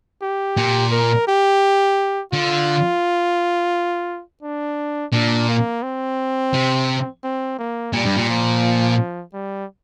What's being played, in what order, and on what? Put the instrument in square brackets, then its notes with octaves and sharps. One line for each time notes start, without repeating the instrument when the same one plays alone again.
[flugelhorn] G4
[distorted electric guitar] A#2
[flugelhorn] A#4
G4
[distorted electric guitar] D3 [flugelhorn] F4
[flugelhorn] D4
[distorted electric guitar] A#2 [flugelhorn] D4
[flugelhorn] A#3
C4
[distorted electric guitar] C3
[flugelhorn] C4
A#3
[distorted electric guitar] A#2 [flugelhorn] G3
[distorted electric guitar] G2
A#2
[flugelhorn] F3
G3